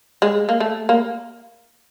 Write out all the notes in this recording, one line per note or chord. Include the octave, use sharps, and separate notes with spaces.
G#3
A#3
A3
A#3